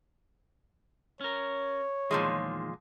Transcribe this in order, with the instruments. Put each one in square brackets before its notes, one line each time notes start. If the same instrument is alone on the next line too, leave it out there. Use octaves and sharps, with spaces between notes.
[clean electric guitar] C#4 A#4 [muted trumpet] C#5
[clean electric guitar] E2 D#3 [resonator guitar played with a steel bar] A#2 F3 G#3